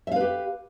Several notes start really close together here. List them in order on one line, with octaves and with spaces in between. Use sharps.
E5 F5 B4 G4